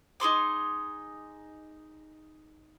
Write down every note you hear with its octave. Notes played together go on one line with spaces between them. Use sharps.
D#4 G#4 C6 D6